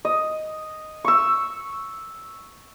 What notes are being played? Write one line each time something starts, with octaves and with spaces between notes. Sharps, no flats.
D#5
C#6 E6